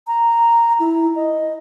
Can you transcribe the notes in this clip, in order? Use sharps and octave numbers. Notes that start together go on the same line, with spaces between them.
A#5
E4
D#5